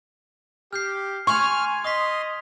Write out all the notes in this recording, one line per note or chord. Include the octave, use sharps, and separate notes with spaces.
G4 F6 G6 C7
G#5 C6 C#6 F6 G#6 F7
D#5 C6 D#6 B6